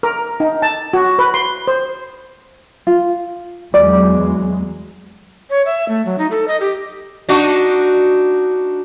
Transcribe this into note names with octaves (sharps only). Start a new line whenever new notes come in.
A#4
D#4
A5
F#4
B4
C6
C5
F4
E2 F#3 G#3 D5
C#5
E5
A3
F#3
D#4
A4
D#5
G4
D4 D#4 F#4